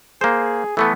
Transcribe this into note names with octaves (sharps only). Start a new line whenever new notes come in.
A#3 G#4 C5
E3 A3 B3 A4